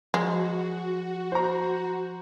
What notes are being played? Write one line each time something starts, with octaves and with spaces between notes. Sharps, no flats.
F3 G#3 F#4
C5 A#5